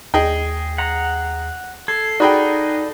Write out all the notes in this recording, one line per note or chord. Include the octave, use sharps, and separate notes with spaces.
D#2 G#4 D#5 G5
F#5 A#5
A4 G#6 C7
D#4 F#4 G#4 D5 G5 B5